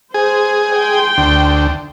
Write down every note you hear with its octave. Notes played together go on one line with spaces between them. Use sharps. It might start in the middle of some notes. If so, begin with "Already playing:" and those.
G#4 C5
G5 C6
D2